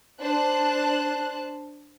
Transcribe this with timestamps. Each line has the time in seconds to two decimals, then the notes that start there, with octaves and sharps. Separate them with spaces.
0.21 D4 C5 A5 F#6